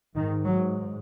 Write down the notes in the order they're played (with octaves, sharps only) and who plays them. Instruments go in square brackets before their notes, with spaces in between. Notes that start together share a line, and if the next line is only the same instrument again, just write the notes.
[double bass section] G#2 D#3
F#3